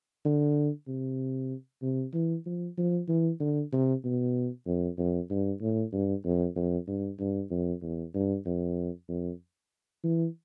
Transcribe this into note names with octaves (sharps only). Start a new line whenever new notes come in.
D3
C3
C3
E3
F3
F3
E3
D3
C3
B2
F2
F2
G2
A2
G2
F2
F2
G2
G2
F2
E2
G2
F2
F2
E3